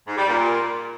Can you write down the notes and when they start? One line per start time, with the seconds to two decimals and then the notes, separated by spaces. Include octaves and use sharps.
0.07 G#2
0.17 G3
0.28 A#2